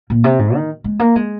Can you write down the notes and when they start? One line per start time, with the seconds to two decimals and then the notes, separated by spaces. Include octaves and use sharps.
0.10 A#2
0.24 C3
0.39 G#2
0.55 D#3
0.84 G#3
0.99 A#3
1.16 G#3